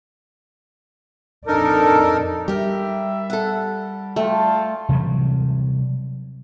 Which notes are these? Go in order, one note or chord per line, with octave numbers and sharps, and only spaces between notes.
F2 D4 D#4 A4 A#4
G3 G4 A#4 E5
A4 F#5
A3 F4 G5 A5
C3 E3 F#3 G3